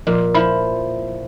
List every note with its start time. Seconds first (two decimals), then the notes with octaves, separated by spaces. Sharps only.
0.07 A#2 F3
0.35 F3 E4 B5